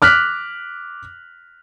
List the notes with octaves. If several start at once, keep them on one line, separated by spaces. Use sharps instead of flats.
D6 F6 F#6 B6